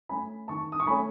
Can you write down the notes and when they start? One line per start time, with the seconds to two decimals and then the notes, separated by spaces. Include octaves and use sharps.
0.09 A3 C#4 G#5 B5
0.48 D#3 A5 C#6
0.72 D#6
0.80 C#6
0.87 A3 C#4 G#5 B5